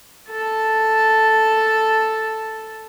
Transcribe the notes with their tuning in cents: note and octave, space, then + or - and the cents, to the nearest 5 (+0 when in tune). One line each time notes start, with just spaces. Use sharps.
A4 +0 A5 +0